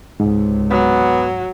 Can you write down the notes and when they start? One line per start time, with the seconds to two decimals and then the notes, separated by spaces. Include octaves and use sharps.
0.20 C#2 G#2 C3
0.71 F#3 B3